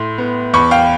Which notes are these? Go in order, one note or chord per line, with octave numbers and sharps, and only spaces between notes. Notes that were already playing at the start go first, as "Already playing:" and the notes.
Already playing: A2 A3 C6
B3
E2 B5 C#6
F5 G5